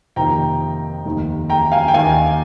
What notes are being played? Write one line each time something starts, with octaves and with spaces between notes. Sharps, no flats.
F2 C3 D#3 A#3 G5 A#5
F1 D#2 D#3
G5 A#5
F5 G#5
G5
D#2 D#3 A#3 F5 G#5